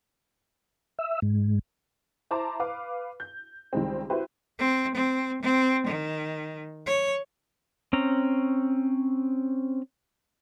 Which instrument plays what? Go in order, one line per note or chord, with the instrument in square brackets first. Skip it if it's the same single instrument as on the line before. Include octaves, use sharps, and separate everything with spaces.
[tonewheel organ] E5
G#2
[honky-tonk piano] E4 C5 A5 A#5 D6
B4 F5 D6
G6
C#2 D#3 G3 G#3 C4
E4 F#4 G4 B4 C5
[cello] C4
C4
C4
D#3
C#5
[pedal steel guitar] C4 C#4 A#5